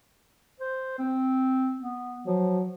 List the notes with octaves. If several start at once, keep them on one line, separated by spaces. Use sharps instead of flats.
C5
C4
B3
F3 F#3